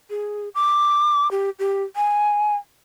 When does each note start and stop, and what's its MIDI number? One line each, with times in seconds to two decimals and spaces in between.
0.10 0.49 68
0.55 1.30 86
1.31 1.50 67
1.59 1.83 67
1.96 2.56 80